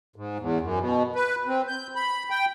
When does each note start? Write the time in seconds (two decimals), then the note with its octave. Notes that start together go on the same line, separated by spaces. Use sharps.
0.16 G#2
0.40 E2
0.61 F#2
0.79 B2
1.15 B4
1.47 C4
1.68 G6
1.95 B5
2.30 G5